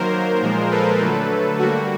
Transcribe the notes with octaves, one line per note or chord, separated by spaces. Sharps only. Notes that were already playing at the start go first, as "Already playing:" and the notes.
Already playing: D#3 F#3 A#3 A#4 C5
A#2 F3 G#3
A4 B4
D3 F#3 A3
D3 G3 A#3 F#4